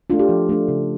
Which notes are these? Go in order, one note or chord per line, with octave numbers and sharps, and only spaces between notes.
A3 D4 F4
G4
F3
A3 D4
C#3